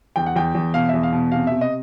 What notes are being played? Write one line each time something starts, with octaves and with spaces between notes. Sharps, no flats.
E2 G5
F#5
E2 G5
E2
B2 F5
E2 E5
F5
B2
C3 F5
C3 E5
D#5